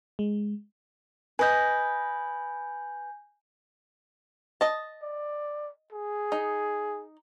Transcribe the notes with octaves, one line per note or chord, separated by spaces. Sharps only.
G#3
B4 D#5 G#5 G6
D#5 A5
D5
G#4
D#4